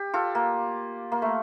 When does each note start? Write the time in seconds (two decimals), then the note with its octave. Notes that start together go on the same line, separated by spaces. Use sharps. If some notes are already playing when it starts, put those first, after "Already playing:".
Already playing: G4
0.14 F4 A4
0.35 A#3
1.12 A#3
1.22 A3